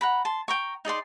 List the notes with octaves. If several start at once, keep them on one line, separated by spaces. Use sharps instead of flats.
F#5 A#5 B5
A5 C6
G5 A#5 C#6
D#4 G#4 D5 C6